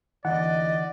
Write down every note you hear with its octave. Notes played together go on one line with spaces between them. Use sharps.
D2 E3 D5 D#5 F#5